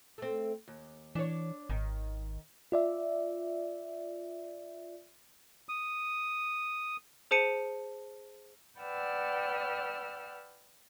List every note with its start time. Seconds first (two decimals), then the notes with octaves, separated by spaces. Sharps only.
0.18 A3 C4
0.68 D#2
1.15 E3 D4 C#5
1.70 G#1 D#3
2.72 F4 D5 E5
5.69 D#6
7.31 G#4 C5 A5 C#7 D#7
8.79 B4 D5 F#5 G5 E6 F6